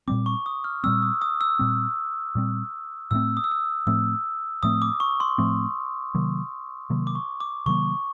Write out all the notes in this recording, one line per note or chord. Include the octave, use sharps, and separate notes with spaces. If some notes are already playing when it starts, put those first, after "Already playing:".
A#2 G3 C4 D6
C#6
D#6
F6
A#2 G3 C4 E6
D#6
D#6
E6
A#2 G3 C4
A#2 G3 C4
A2 F3 A3 C4 E6
D#6
E6
D#6
A2 F3 A3 C4 E6
A2 F3 A3 C4 D#6
D6
C#6
C6
A2 F3 A3 C4
C3 D#3 F#3 A#3
C3 D#3 F#3 A#3
D6
C#6
D6
C3 D#3 F#3 A#3 C#6